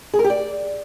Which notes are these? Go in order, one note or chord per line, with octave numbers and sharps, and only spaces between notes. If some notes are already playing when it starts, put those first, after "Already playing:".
G#4
A#4
G4
D5